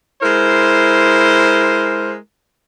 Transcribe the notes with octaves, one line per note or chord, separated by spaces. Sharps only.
G#3 E4 A#4 C5